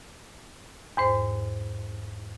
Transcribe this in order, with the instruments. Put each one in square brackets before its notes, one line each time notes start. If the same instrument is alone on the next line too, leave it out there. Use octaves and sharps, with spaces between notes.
[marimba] E2 G#2 C5